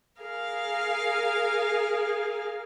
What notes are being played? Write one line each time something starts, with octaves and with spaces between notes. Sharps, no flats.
G#4 A#4 F5